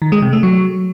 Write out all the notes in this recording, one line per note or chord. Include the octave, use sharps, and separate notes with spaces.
D#3
G#3
C3
A3
F#3